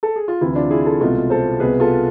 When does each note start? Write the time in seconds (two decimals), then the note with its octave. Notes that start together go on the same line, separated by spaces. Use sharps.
0.03 A4
0.16 G#4
0.28 F4
0.41 D2 C3 E3 E4
0.55 D4 F4
0.70 E4 G#4
0.85 F4 A4
1.00 C2 B2 G#3 F4 A4
1.30 A4 C5
1.60 C2 B2 B3 G#4 B4
1.80 F4 A4